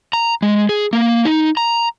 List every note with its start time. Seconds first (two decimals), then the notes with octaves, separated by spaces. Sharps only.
0.13 A#5
0.42 G#3
0.69 G#4
0.93 A#3
1.25 D#4
1.57 A#5